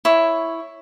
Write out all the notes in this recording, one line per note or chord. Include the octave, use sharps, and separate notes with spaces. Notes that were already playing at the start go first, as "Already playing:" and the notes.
E4 C#5